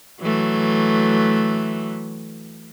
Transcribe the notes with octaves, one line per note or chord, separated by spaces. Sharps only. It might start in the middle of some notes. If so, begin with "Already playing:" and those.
E3 F#3 A3